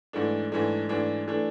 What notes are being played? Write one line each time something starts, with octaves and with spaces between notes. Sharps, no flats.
G#2 E3 A3 D4
G#2 E3 A3 D4
G#2 E3 A3 D4
E3 A3 D4